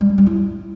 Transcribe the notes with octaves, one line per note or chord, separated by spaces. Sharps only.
G3
D4
G3
E4